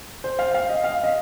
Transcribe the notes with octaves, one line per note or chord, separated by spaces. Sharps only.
C5
F5
F5
D#5
F5
D#5